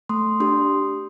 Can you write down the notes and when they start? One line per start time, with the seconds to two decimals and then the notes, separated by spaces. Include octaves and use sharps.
0.09 A3 C6 D#6
0.40 D4 G4 C6 D#6